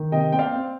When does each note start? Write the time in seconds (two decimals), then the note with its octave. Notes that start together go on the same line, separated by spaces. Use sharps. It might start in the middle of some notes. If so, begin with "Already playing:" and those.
Already playing: D#3
0.12 C3 D#5 G5
0.32 C4 G5
0.38 D5 F5
0.52 C4